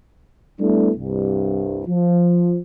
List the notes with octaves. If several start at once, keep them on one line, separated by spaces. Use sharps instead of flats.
G3 A3 B3 D4 E4 A4
C2 G2
F3 F4